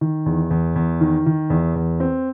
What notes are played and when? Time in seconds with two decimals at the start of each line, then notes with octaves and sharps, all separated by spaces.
0.01 D#3
0.26 E2
0.51 E2
0.76 E2
1.01 D#3
1.26 D#3
1.50 E2
1.75 E2
2.00 C4